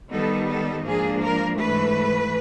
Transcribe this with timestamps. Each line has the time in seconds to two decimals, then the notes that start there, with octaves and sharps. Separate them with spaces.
0.12 D#3 G3 B3 D#4 A4
0.48 A4
0.85 G#2 F3 A#3 D4 G#4
1.22 A#4
1.58 G#2 E3 A3 B4